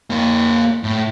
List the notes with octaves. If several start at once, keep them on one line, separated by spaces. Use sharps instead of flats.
A#3 C#5
A2